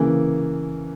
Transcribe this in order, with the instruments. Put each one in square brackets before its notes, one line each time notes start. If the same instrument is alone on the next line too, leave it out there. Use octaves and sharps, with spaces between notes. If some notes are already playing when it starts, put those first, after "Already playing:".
Already playing: [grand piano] C#3 E3 A#3